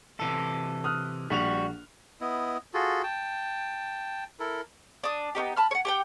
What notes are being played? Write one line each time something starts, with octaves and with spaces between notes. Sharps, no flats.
C3 E3 A4
D#6 F6 F#6
A#1 G3 F#4 F7
B3 E4 D#5
F4 F#4 G#4 A4
G5 A5
E4 A4 A#4
D4 D#6
B3 C#4 D#4 G4
A5 B5 F6
C#5 F#5
G4 F#5 G5